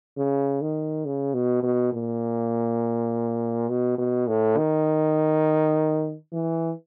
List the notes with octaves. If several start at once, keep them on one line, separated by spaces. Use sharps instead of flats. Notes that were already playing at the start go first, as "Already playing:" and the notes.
C#3
D#3
C#3
B2
B2
A#2
B2
B2
A2
D#3
E3